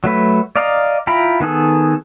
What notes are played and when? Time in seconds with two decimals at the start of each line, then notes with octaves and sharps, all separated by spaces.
0.04 F#3 A3 B4
0.56 D5 D#5 F5 A#5
1.07 E4 F4 G5 A#5 B5
1.40 D#3 B3 G#4 A4